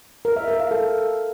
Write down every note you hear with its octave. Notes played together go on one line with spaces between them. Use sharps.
A#4
E5
A#4
F5
A4